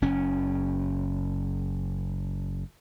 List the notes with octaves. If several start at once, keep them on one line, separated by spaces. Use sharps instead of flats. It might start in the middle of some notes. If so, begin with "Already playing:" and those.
F#1 C#4